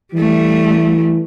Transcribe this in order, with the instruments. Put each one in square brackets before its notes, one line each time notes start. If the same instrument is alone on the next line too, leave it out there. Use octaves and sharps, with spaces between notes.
[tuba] E3 [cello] G3 A3